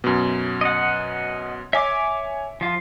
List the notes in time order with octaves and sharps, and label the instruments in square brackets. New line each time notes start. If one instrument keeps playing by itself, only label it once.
[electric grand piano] F#2 B2
[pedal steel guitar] D#5 F#5
[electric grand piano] C#5 G#5 [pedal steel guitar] E5 D6
[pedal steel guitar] F3 F4